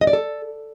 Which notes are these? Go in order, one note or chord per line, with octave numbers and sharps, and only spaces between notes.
D#5
D5
A4